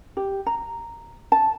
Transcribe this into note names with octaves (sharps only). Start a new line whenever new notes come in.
G4
A#5
A5